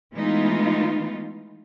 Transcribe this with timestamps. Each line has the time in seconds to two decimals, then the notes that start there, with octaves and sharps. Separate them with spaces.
0.14 E3 G#3 A3 B3 D#4 F4